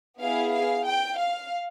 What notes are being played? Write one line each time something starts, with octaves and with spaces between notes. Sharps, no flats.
B3 E4 G#4 F5
F5
G5
F5